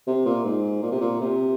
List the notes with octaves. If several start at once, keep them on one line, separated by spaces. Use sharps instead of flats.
C3
A#2
G#2
A#2
C3
A#2
C3